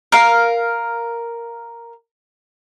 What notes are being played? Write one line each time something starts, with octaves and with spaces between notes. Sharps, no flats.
A#4 F5